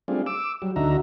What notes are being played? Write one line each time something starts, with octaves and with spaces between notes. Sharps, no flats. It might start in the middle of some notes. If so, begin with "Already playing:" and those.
G3 A3 C4 D4 F4 G#4
D6 E6
F#3 G3
D2 D3 D#4 F#4 E5 A#5